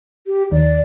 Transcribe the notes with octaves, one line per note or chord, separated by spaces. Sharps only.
G4
D#2 D5